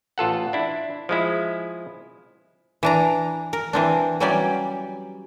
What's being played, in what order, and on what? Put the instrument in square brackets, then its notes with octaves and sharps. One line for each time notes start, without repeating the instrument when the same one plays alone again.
[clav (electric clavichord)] A1 F4 A4 F#5
D4 E4
F3 G#3 E4
[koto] E3 D4 A#5
A#4
E3 C4 D4
E3 F#3 G3 C#4 G4 D5